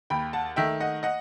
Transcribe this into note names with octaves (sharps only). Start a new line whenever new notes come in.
D#2 G5 B5
F#5 A5
D#3 A3 E5 G5
D#5 F#5
D#5 F#5